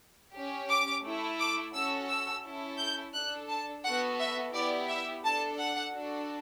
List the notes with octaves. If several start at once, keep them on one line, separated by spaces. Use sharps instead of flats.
C#4 G4
D6
A3 E4 A4
D6
C#4 F#4 A4 E6
E6
C#4 E4 A4
G6
D4 A4 F#6
A5
B3 F#4 A4 F#5
E5
B3 E4 G4 D5
E5
D4 A4 A5
F#5
D4 F#4 A4